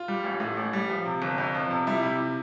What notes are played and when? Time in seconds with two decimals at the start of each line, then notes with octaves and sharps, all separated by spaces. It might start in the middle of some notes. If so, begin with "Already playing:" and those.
Already playing: F4
0.08 G3
0.24 A1
0.40 A2
0.57 A1
0.73 G3
0.90 F3
1.05 C3
1.22 G1
1.38 F2
1.55 F3
1.71 C3
1.87 G3 E4
2.03 C3